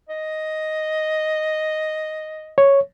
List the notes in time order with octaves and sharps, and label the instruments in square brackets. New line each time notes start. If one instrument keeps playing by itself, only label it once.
[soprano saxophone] D#5
[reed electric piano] C#5